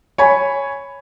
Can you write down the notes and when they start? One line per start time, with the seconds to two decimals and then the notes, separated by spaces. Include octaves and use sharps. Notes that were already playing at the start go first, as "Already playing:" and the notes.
0.18 C#5 G#5 B5